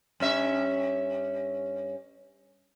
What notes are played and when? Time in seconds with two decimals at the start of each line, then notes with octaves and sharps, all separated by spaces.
0.20 G2 C#4 E5